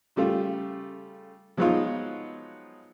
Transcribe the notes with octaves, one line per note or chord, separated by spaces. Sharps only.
C#3 G3 A3 F4
F3 F#3 G#3 B3 D#4 F4